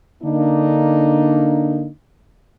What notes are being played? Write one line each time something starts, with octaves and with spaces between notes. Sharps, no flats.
D3 A#3 D4 D#4